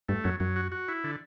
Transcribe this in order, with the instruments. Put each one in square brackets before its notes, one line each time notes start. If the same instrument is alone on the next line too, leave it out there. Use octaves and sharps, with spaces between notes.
[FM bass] G2 [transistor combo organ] A3
[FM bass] F#2 [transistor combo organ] F#3
[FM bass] F#2 [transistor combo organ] F#3
[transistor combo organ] F#4
F#4
E4
D3